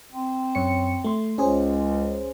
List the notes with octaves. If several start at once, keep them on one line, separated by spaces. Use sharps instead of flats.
C4
F#2 C#5 C#7
A3 C6
C#2 C#4 G#4 C5